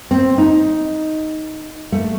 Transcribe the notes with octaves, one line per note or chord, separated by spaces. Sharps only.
C4
D#4
A3